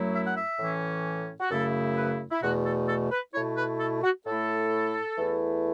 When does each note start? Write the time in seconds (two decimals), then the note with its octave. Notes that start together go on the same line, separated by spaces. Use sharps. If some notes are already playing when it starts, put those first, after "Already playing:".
Already playing: F#2 F#3 A3 E4
0.14 E5
0.27 F#5
0.37 E5
0.59 A2 E3 C#4
1.40 F#4
1.51 F#2 C#3 A3 E4 A4
1.97 B4
2.31 E4
2.43 E2 B2 A3 F#4
2.65 A4
2.88 A4
3.12 B4
3.34 B2 A3 E4 C#5
3.57 B4
3.80 A4
4.03 F#4
4.26 A2 A3 E4 A4
5.17 E2 E3 A3 E4